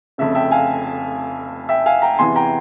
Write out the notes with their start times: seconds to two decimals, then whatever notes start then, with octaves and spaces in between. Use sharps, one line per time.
0.18 F1 F2 C#3 E5
0.35 E5 G5
0.51 F5 G#5
1.69 E5 G5
1.86 F5 G#5
2.02 G5 A#5
2.19 E2 C3 E3 G#5 C6
2.36 G5 A#5